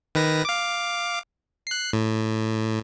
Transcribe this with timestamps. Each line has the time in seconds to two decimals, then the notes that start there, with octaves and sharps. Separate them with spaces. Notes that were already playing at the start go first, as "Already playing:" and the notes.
0.15 D#3 B4 A#6
0.45 F5 D6
1.67 F#6 C7
1.93 A2